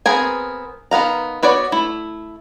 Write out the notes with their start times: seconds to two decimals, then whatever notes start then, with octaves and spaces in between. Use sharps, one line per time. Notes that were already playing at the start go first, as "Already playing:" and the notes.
0.06 B3 C4 G#4 A#4 G#5
0.91 D#3 B3 F5 A#5
1.43 B3 F#4 C#5 D5
1.72 A3 E4